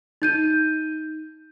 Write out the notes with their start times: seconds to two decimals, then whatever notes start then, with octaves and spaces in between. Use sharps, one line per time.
0.22 D#4 G6 D#7